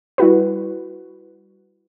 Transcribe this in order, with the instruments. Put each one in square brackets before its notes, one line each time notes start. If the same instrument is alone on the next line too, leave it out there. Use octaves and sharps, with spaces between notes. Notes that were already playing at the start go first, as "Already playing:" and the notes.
[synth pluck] G3 E4 F#4 B4